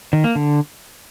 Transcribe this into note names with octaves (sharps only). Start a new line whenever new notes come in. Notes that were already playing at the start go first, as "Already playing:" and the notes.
D#3
A#3
D3